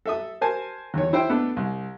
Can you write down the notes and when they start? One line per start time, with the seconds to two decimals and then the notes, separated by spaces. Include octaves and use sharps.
0.06 A4 E5 D#6
0.41 A#4 C5 G#5 A5
0.94 E2 D#3 C#5
1.13 E4 C5 G5
1.29 A3 B3 D4 A4
1.56 C2